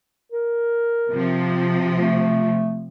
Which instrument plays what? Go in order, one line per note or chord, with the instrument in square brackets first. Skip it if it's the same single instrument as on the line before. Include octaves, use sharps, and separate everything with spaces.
[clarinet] A#4
[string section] C3 F3
[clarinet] A3